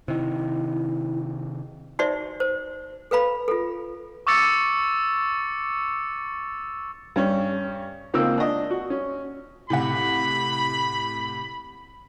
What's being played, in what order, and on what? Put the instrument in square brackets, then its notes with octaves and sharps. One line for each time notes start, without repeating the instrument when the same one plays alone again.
[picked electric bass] C3 D#3 [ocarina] E4
[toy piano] D#4 F#4 C5 D5 E5
C5
A4 B4 F5 B5
F4 A4
[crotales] C#6 D6 E6 A6 C#7
[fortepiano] G2 C#4
C#2 A#3 C4 D#4 E6
D4 D#5
F#4
C#4
[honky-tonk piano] A2 C3 F#5 [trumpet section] B5